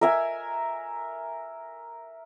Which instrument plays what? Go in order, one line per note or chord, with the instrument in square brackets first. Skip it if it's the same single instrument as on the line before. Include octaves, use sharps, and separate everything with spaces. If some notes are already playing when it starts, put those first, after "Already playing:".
[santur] A#4 E5 G#5